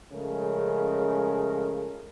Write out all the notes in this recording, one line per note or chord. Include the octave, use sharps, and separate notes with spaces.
C#3 F3 G#3 A3 C#4 A#4